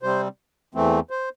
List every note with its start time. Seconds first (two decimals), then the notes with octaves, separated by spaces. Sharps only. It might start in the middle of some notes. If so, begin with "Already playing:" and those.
0.02 C3 G3 C4 C5
0.75 E2 E3 A3 C4
1.10 C5